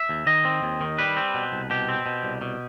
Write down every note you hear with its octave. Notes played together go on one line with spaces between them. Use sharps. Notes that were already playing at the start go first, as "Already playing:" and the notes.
Already playing: E5
D#2
D#3 D#5
C4
D#2
D#3
G3 B4
C4
B2
C2
B2 G4
C4
B2
C2
B2